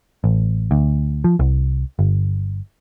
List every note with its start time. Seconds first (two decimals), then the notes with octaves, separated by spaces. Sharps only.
0.24 A1
0.71 D2
1.24 F3
1.39 C2
1.99 G1